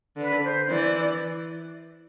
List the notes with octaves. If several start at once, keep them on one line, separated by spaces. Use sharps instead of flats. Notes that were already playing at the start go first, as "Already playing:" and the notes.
D3 B4
C5
E3 D5